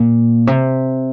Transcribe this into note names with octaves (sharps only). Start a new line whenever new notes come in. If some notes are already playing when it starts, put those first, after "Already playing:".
Already playing: A#2
C3